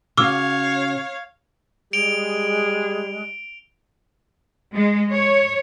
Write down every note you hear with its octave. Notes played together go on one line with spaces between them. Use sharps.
C#3 F#4 C#5 F5 D6 E6 F6
G3 G#3 G#4 D7 F7 G7
G#3
C#5